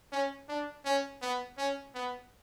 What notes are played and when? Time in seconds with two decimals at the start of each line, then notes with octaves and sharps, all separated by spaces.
0.12 C#4
0.49 D4
0.85 C#4
1.22 B3
1.58 C#4
1.95 B3